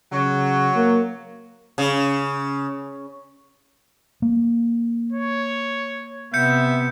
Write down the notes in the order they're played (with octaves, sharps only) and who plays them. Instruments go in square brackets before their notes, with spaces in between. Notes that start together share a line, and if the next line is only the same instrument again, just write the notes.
[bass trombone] C#3 [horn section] F#3
[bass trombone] A#3
[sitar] C#3
[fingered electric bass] A#3
[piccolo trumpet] C#5
[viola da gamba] C3 B3 [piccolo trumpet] E5 [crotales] G6 C#7